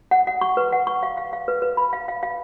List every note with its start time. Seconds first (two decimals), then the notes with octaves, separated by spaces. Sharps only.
0.11 F#5
0.27 F#5
0.41 C#6
0.57 B4
0.72 F#5
0.87 C#6
1.03 F5
1.17 F5
1.33 F5
1.48 B4
1.62 B4
1.77 B5
1.93 F5
2.08 F5
2.23 F5